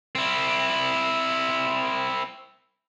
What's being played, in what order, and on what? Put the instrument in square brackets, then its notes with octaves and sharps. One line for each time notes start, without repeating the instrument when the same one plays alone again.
[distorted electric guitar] C4 E4